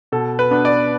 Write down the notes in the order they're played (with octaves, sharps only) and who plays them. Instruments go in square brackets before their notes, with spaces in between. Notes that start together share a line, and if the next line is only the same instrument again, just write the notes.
[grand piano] B2 A4
B4
B3 D4
D5